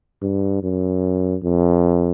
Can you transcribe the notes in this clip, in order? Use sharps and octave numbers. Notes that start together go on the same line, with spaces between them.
G2
F#2
F2